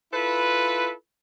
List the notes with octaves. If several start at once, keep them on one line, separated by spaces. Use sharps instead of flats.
E4 F4 A4 B4